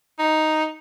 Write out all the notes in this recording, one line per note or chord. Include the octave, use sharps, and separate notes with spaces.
D#4